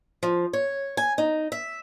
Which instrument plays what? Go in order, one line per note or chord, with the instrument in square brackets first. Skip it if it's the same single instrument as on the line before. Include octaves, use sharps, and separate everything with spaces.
[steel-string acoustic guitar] F3
C#5
G#5
D#4
E5